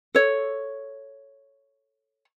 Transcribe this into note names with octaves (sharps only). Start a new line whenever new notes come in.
A4 C#5